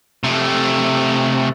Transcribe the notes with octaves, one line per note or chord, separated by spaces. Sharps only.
C3 A3